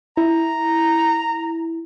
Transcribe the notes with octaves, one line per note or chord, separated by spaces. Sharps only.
E4 A#5